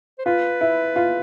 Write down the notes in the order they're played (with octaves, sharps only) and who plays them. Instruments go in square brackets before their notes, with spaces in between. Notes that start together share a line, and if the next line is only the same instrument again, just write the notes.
[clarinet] C5
[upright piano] F4 [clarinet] B4
[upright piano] E4
F4